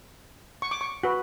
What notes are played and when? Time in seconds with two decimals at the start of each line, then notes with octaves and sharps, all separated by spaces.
0.62 C#6
0.71 D6
0.81 C#6
1.03 F#4 B4